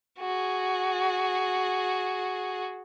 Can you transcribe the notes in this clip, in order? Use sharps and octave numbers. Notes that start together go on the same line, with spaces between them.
F#4 G#4